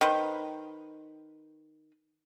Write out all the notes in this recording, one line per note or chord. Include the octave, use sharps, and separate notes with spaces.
D#3 B4 C5